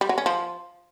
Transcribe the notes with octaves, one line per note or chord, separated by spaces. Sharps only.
G3
F#3
C#4
F3